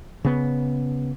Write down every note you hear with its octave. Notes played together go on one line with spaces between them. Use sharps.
C#3 B3